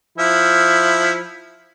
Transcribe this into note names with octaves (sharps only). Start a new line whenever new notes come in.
F3 E4